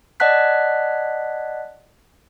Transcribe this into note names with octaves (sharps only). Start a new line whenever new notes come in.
D5 D#5 F#5 A5 F#6 B6